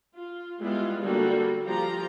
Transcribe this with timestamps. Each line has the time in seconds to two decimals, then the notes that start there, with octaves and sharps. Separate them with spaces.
0.14 F4
0.61 G3 G#3 B3 E4 F4
1.03 D3 G3 A#3 F#4 A4
1.67 F3 A#3 F4 G4 A#5